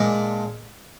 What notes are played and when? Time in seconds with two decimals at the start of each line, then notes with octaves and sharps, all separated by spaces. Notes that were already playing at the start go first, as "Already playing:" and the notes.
Already playing: A#2 G#3 D4 G#4